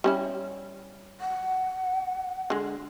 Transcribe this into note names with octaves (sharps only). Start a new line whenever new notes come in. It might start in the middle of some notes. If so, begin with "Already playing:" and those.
G3 C#4 E4
F#5
D3 G#3